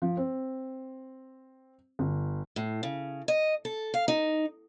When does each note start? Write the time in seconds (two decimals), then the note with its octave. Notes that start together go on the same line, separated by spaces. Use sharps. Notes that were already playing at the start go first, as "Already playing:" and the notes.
0.02 F3
0.17 C4
1.99 G1
2.56 A2
2.83 C#3
3.28 D#5
3.65 A4
3.94 F5
4.08 D#4